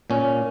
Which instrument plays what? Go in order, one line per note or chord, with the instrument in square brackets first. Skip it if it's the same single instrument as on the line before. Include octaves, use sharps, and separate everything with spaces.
[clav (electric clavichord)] A#2 C#4